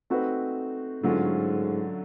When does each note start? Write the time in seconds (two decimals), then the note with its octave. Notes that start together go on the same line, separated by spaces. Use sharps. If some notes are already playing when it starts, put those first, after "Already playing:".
0.10 A3 C4 D#4 F#4 B4
1.03 G#2 D3 F#3 A3 C#4 F4